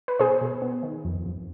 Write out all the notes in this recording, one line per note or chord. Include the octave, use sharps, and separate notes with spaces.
B4
B2 G#4 C5
B2
B3
D#3
F2
F2